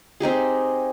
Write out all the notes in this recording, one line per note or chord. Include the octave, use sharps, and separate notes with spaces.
C4 D#4 G4 G#4